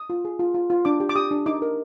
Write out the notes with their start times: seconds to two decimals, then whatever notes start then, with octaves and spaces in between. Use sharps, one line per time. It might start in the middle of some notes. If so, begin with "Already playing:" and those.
Already playing: D#6
0.10 F4
0.25 G#4
0.39 F4
0.54 F4
0.70 F4
0.85 D4 D6
1.00 G4
1.09 D6
1.16 G4 D#6
1.31 D4
1.46 D#4 D6
1.62 A#4